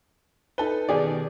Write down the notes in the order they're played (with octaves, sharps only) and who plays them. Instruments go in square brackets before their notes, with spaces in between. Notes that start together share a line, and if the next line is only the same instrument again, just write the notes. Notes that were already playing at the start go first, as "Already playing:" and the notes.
[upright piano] D#4 A4 B4 [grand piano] G7
[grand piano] B2 D#3 G4 [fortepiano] G#4 D5